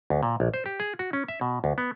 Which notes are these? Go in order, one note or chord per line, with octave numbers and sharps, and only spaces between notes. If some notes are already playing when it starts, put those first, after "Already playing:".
D2
A#2
A#1
C5
G4
G#4
F#4
C#4
E5
B2
D2
B3